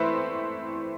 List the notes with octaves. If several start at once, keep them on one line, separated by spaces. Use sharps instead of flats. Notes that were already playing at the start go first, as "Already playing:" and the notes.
Already playing: E3 A3 C4 E4 B4 C5